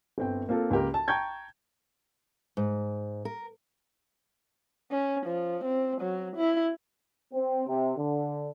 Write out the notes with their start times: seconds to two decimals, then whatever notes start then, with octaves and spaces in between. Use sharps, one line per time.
0.18 G1 C4 G5
0.49 A#3 C4 F4 A4
0.70 C#2 A#3 G4 A#4
0.94 A5
1.08 G5 A5 A#5 C#6 G6 G#6
2.57 G#2
3.25 A#4
4.91 C#4
5.26 F3
5.64 C4
6.01 F#3
6.36 E4
7.33 C4
7.67 C3
7.97 D3